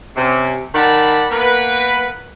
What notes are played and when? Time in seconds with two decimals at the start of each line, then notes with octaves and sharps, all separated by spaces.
0.16 C3 C#4
0.75 D#3 D5 F#5 A5 B5
1.31 A#3 B3 A#4 B4